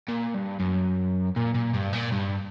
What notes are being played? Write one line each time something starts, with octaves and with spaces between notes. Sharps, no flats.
A#2
G2
F#2
A#2
A#2
G2
A#2
G2